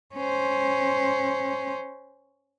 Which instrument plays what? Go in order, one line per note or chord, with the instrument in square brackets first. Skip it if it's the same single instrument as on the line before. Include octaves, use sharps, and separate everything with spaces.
[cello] C#4 C5